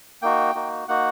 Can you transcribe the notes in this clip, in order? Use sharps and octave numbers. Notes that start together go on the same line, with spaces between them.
A#3 D#4 F#4 G5
A#3 D#4 F#4
A#3 D#4 F#4 F#5